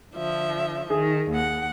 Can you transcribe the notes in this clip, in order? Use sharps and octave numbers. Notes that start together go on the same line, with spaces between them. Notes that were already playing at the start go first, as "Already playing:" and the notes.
D3 F3 E5
D#3 G#4
D#2 F#5